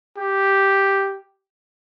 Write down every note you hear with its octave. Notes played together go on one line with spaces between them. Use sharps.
G4